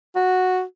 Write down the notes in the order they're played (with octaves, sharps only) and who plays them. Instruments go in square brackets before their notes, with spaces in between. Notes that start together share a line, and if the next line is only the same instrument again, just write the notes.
[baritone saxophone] F#4